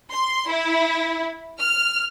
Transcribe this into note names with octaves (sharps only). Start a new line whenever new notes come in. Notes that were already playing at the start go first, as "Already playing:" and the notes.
C6
E4
F6